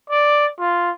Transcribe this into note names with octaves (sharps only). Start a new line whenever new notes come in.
D5
F4